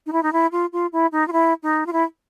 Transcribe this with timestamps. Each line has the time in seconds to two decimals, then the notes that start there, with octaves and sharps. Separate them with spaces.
0.06 D#4
0.13 E4
0.23 D#4
0.33 E4
0.52 F4
0.73 F4
0.93 E4
1.12 D#4
1.28 F4
1.32 E4
1.63 D#4
1.87 F4
1.93 E4